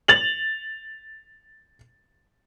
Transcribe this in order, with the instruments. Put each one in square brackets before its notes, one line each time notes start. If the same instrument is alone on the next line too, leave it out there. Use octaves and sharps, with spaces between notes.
[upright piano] A6 F7 F#7